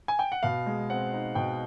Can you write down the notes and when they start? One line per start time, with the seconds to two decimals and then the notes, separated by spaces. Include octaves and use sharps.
0.08 G#5
0.19 G5
0.32 F#5
0.43 B2 F5
0.66 G#3
0.90 C4 F#5
1.13 D#4
1.35 B2 G5